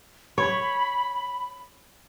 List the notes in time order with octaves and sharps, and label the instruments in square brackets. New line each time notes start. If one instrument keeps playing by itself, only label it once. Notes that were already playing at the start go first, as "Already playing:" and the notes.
[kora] C#5 [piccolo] B5